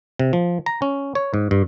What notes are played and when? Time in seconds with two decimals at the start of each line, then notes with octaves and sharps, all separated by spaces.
0.19 C3
0.33 F3
0.66 A#5
0.82 C#4
1.15 C#5
1.34 G#2
1.51 G2